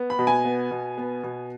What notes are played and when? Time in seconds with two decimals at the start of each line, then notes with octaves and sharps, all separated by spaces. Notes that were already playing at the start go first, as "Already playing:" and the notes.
Already playing: B3
0.10 B5
0.19 B2
0.27 G#5
0.45 B3
0.71 B2
0.98 B3
1.24 B2